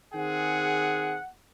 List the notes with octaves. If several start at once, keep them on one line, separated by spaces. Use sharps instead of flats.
D#3 C4 G#4 F#5